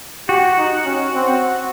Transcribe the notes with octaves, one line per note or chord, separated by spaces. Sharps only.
F#4 G4
D#4
C#4
C4